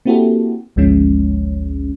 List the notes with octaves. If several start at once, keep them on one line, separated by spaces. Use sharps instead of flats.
A#3 C4 E4 F#4 G4 A4
G#1 D2 F3 G#3 C#4